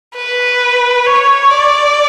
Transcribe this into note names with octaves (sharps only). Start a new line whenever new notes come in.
B4
C#5
D5